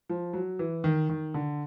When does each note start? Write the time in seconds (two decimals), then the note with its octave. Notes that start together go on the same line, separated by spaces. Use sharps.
0.09 F3
0.33 F#3
0.59 E3
0.84 D#3
1.09 D#3
1.34 D3